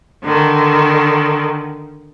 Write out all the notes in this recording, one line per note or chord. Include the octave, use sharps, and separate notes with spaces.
D3 D#3